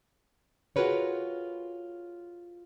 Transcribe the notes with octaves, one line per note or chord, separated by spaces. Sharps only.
F4 F#4 G#4 A#4 B4 C#5